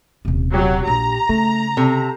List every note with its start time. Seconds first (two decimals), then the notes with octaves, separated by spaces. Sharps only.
0.25 D#1 C3
0.54 F#3 G4
0.87 A#1 A#5
1.29 C#3 A3
1.77 C3 A4